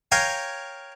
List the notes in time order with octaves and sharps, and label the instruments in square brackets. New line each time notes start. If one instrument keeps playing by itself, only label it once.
[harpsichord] A#4 C#5 F5 G5 G#5